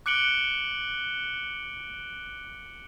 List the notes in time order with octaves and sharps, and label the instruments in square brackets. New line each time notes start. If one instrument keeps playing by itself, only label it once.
[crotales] D6 F#6 C#7 D7 F#7 G7